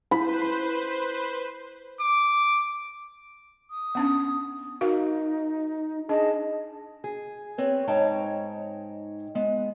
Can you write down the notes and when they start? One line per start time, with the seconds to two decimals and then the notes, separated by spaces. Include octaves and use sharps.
0.11 E4 B4 C5 B5
2.01 D6
3.71 D#6
3.95 B3 C#4 D4
4.81 D#4 F#4 A#4 F5
6.09 D4 G#4 D#5 A5
7.04 G#4
7.58 C4 B4 C#5
7.87 G#2 D#4 C#5 G5 A5
9.35 G#3 B3